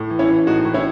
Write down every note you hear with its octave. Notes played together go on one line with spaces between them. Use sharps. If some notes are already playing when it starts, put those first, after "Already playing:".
Already playing: A2
E3
C#4 E4
E3
A2 D#4 F#4
A2
C#4 E4